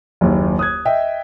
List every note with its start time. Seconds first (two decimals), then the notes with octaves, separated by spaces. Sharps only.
0.21 F#1 D#2
0.59 D#6 F#6 G#6
0.85 D#5 E5 G5